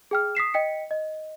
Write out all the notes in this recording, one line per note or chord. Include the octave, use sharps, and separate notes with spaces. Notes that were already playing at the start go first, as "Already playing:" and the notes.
G#4 G5 F6
D#6 B6 C7 E7
D#5 G5 B6 C#7
D#5